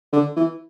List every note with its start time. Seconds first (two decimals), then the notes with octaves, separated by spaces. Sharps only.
0.13 D3
0.36 E3